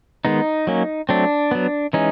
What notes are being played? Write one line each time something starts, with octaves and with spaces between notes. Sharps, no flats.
D#3 G#3 B3 D#4
F#3 A#3 C#4
F#3 A3 C4 D4
F#3 B3
E3 G#3 C#4 D#4